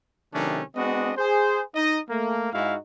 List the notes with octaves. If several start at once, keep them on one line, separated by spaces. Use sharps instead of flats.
C3 D#3 F#3 A3 C#4 D4
G#3 B3 C4 D4 F#4 D#5
G#4 C5
D#4 D#5
A3 A#3
G#2 G#3 D#4 E4 F#4 F5